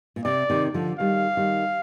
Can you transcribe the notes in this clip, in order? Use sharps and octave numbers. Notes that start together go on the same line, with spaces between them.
A#2
C3 D5
C3 D#3
D3 F3
D#3 G3 F5
D#3 G3